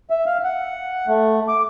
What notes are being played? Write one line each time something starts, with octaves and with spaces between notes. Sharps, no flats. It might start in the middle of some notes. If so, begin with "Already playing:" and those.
E5
F5
F#5
A3
D6